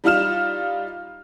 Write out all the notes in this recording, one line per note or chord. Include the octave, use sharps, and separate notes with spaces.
G3 D#4 F4 F6 E7